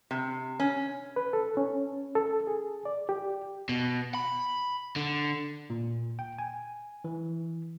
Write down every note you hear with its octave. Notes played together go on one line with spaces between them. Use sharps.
C3
C#4
B4
A4
C#4
A4
G#4
D5
G4
B2
B5
D3
A#2
G5
G#5
E3